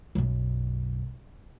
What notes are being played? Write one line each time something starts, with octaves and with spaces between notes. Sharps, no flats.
B1 F#2